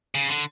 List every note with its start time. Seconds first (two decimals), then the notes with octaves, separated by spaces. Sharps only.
0.15 C#3
0.29 D3